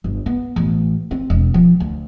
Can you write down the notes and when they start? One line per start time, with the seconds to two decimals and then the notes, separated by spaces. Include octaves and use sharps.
0.04 G1
0.26 B3
0.56 A1
1.11 C4
1.30 E1
1.54 F3
1.80 D2